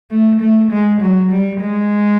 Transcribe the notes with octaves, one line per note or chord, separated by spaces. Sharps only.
A3
A3
G#3
F#3
G3
G#3